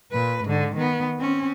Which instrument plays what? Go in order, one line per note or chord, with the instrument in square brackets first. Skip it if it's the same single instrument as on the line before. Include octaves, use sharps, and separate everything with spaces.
[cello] A#2 B4
G#2 D3
D#3 B3
C4 C#4